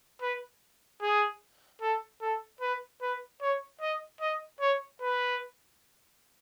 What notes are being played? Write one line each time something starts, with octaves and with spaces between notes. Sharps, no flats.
B4
G#4
A4
A4
B4
B4
C#5
D#5
D#5
C#5
B4